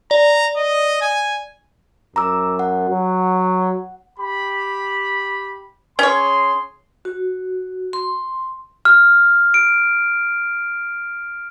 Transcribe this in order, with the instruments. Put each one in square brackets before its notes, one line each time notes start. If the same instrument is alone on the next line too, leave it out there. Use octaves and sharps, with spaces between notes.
[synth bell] D5 [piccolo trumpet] A#5
[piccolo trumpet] D#5
G#5
[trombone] F#2 [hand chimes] A#5 D6 E6
[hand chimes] F#5
[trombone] F#3
[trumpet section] G4 B5
[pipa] C#4 C#5 [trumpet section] G#4 C6
[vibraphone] F#4
C6
[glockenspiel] F6
D7